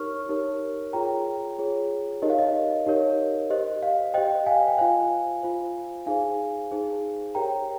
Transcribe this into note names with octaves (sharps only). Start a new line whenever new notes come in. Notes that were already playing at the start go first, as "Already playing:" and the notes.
Already playing: D#4 G4 A#4 C#5 C#6 F6
D#4 G4 A#4 C#5
F4 G#4 C#5 G5 A#5
F4 G#4 C#5
D#4 G4 A#4 C#5 D#5
F5
D#5
D#4 G4 A#4 C#5
G4 C5 D#5
F5
G4 C5 D#5 G5
F5 G#5
G5
F4 C5 F5 G#5
F4 C5
D#4 G#4 C5 F5 G#5
D#4 G#4 C5
G4 A#4 C#5 G5 A#5